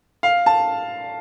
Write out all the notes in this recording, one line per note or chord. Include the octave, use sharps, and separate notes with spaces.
F5
A5